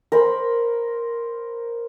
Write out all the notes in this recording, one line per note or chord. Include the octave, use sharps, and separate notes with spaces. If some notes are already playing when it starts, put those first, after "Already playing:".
A#4 C5 B5